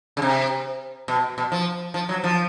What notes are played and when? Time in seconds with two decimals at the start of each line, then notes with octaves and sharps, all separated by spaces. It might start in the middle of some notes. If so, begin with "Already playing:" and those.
0.17 C#3
0.22 C3
1.08 B2
1.38 B2
1.52 F3
1.94 F3
2.09 F#3
2.24 F3